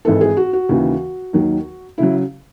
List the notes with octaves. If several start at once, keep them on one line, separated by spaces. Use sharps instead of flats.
G#1 G#2 E3 A4
G#4
F#4
F#4
D#2 C#3 E3
D#2 D#3 F#3
C#3 F#3 E4